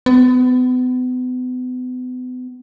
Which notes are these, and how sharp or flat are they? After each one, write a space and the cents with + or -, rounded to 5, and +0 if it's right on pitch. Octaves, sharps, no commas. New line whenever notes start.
B3 +35